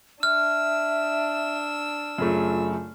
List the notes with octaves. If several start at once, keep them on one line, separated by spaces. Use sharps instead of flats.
D4 E5 E6 F6
F#2 C#3 A3 F4